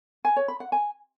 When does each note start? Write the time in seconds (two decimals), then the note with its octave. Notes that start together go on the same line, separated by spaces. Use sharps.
0.25 G#5
0.36 C#5
0.48 B5
0.60 F#5
0.72 G#5